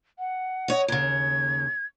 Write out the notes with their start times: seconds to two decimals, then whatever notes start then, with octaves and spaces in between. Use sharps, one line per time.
0.19 F#5
0.68 C#5 D#5
0.88 D#2 C#3 G#6